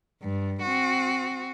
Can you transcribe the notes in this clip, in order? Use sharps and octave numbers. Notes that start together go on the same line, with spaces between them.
G2
C4 F#4